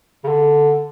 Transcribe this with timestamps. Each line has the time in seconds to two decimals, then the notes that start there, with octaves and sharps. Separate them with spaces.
0.24 C#3
0.28 D3